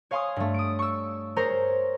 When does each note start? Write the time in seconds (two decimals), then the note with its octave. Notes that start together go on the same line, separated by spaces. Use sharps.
0.11 C#5 F5 G#5 C6 C#6 D#6
0.36 G2 A3
0.54 D#6 D7
0.79 C#6 E6
1.36 G#4 A#4 C5 C#5 A#5